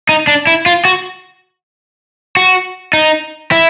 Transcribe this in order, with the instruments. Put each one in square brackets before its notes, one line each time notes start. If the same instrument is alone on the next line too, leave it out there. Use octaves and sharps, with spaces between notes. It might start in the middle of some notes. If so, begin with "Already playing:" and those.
[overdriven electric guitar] D#4
D4
E4
F4
F#4
F#4
D#4
E4